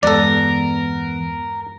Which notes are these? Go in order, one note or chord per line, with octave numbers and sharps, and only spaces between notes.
E2 G2 G#3 B3 A4 A#4 D5